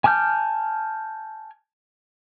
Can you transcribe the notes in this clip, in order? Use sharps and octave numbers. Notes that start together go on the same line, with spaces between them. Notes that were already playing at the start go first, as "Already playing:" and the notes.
G#5 A5 D6 F6 G6